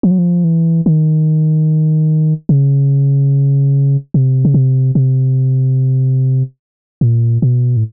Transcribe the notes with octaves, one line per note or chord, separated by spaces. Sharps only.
F3
F#3
F3
E3
D#3
C#3
C3
C#3
C3
C3
A#2
B2
A2